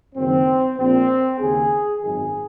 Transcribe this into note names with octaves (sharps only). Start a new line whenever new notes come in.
F#1 F#2 D#3 C4
A#1 A#2 C4
D#2 C#3 G#4
G#1 F#2 D#3 G#4